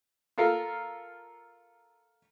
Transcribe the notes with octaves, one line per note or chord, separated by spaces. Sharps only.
F4 A4 A#4 F5